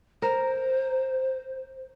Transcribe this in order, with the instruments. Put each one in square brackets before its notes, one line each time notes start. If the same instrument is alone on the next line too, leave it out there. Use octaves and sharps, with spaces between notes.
[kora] A#4 [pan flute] C5